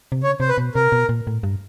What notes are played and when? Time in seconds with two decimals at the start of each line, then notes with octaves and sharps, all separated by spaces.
0.12 C3
0.22 C#3 C#5
0.40 C3 C5
0.49 B4
0.58 B2
0.75 C3 A#4
0.92 B2
1.09 A#2
1.27 A2
1.43 G2